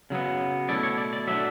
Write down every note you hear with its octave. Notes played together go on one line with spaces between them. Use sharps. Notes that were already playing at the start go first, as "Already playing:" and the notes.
C#3 F#3 B3
B2 A3 E4 D5
C#5
D5
D5
F#3 A3 D4 E5